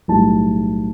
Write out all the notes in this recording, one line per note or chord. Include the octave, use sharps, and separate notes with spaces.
B1 A2 G3 A5